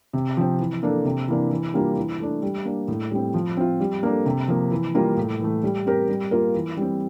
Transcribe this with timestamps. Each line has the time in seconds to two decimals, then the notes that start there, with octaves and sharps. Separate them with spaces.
0.13 C3
0.37 F3 C4
0.59 E3
0.83 A#3 D4 A4
1.05 C3
1.28 E3 A#3 D4
1.51 E3
1.74 G3 A#3 D4 F4
1.96 E3
2.19 A3 D4
2.42 G3
2.65 A#3 D4
2.88 A2
3.11 G3 C4
3.34 F3
3.57 C4 F4
3.80 G3
4.03 A#3 D4 A4
4.26 C3
4.48 F3 A#3
4.71 E3
4.94 G3 A#3 F4 A#4
5.17 A2
5.40 E3 A3
5.63 G3
5.86 C4 G4 A#4
6.09 G3
6.31 A#3 F4 A#4
6.54 E3
6.77 G3 C4